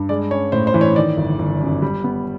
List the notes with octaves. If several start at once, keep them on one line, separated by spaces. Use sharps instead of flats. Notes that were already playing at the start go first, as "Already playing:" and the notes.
Already playing: G2
G#3 D5
C#4 C#5
A2 C5
C5
E3
C#5
D#3 D5
G1
G1
F#2
G3
B3